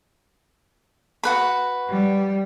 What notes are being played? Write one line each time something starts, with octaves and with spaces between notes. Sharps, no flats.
F#4 B4 B5
G3